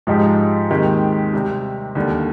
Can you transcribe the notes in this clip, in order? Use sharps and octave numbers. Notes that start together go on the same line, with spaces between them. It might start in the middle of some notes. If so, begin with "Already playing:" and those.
G#2 F3 G#3 D#4 G4
D#2 D#3 G#3 C4 G4
C3 G3 C4
D#2 D3 G3 A#3